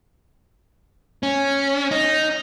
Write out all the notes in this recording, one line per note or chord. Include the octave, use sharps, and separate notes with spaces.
C#4
D#4